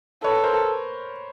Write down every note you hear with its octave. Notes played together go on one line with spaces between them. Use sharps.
A4 B4 C#5
A#4 C5